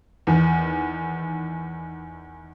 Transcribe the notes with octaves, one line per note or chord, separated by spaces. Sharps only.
E2 D#3